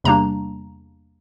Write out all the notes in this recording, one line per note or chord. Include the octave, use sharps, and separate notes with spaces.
E2 C3 G3 A#3 D4 A#5